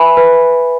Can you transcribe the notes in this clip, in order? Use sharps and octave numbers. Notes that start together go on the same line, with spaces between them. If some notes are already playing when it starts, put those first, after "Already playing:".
Already playing: B4 E5 G#5 B5
B4